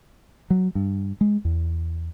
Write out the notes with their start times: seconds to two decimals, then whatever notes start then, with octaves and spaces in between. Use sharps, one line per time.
0.50 F#3
0.75 G2
1.21 G#3
1.45 E2